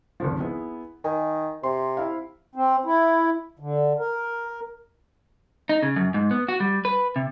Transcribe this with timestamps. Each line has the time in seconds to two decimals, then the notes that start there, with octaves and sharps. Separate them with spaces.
0.20 G#1 C#2 F3
0.40 B3 E4 G#4
1.04 D#3 G#5
1.63 C3 C6
1.97 E4 F5
2.55 C4
2.85 E4
3.59 D3
3.99 A#4
5.69 D#4
5.83 C#3
5.96 F#2
6.14 G#2
6.31 B3
6.49 F#4
6.60 G3
6.85 B4
7.16 C3